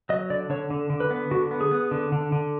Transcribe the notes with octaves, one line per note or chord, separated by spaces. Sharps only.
F#3 D#5
D3 D5
D3 C#5
D3
D3
B4
B3
D3 F#4
B3
G#4
B3
D3
D3
D3